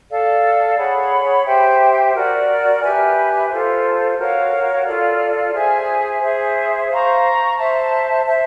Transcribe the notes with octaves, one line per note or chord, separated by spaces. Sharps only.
A4 D5 F5
G#4 C#5 F#5 B5
G4 C5 E5 G5
F#4 A#4 D5
G4 B4 E5 G#5
F4 A4 C5
F#4 A#4 C#5 F5
F4 A4 D5
G#4 C5 E5 G#5
G#4 C5 E5
C5 F5 A#5 C#6
C5 E5 A5
C5 E5 A5